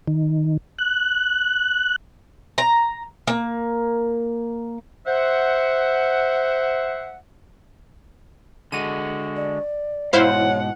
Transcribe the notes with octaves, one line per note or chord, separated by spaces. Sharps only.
D#3
F#6
A#5
A#3
C5 E5 F#5
D3 G#3 F#4 D#7
D5
G#2 B2 E4 C5 C#5 F5 F#5